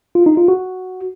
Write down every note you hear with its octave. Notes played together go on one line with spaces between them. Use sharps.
F4
D#4
F4
F#4